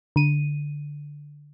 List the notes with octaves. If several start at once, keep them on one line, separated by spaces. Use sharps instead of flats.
D3 D#7